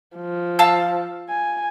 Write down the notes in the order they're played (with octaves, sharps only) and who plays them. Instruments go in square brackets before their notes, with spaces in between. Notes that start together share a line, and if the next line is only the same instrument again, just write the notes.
[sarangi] F3
[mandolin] F5 A5 E6
[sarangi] G#5